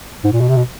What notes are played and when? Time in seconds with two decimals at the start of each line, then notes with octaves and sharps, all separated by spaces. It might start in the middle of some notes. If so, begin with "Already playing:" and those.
0.24 G#2
0.33 A#2
0.41 B2
0.49 C3
0.57 B2